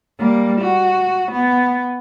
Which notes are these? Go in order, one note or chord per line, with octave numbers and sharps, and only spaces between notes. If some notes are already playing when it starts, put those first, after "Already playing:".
G3 A#3
F#4
B3